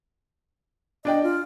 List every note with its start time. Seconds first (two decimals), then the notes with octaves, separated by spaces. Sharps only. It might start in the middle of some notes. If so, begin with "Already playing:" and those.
1.05 D4 D5 D#5 G5
1.23 F4